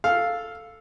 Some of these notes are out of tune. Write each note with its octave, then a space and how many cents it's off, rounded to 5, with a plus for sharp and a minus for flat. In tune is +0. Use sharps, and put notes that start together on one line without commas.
A4 +0 F5 +0